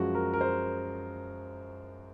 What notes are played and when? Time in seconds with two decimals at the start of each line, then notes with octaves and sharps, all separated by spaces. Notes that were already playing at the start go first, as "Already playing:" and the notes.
Already playing: F#2 F3 G#3 F#4
0.15 A#4
0.34 A#4
0.41 C5